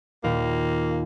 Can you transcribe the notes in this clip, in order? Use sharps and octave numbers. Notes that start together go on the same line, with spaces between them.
D#2 A#2 A#3